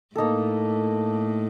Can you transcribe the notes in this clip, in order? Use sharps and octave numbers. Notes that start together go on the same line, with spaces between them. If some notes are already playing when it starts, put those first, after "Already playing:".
A2 A#3 D#4 A4